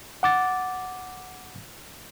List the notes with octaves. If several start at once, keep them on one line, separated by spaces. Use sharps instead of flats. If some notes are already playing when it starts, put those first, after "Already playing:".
F#5 D6 A6